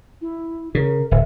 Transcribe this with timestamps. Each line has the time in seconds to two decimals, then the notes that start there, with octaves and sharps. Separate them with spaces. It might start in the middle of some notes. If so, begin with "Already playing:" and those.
0.22 E4
0.75 C#3 A#4
1.11 D1 E5